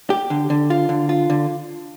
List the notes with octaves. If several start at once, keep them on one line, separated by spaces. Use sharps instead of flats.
G4
D3
D3
F4
D3
F4
D3